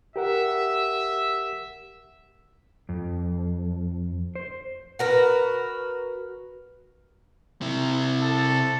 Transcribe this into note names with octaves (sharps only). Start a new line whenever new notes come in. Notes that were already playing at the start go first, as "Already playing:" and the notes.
G4 A#4 E5 F#5
F2
C5
F#4 A#4 B4
C3 E4
A4